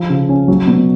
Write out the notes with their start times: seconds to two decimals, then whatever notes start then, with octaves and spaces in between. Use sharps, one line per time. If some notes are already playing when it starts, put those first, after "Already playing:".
Already playing: F3
0.10 C#3
0.29 C#4
0.48 F#3
0.67 B2